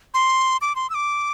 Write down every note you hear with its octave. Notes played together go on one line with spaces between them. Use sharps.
C6
D6
C6
E6
D6